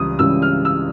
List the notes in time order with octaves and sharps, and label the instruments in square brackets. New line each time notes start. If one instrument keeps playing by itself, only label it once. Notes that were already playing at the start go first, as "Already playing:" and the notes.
Already playing: [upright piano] C#2 C#3 E3 G3 D#6
C#2 C#3 E3 G3 E6
F6
E6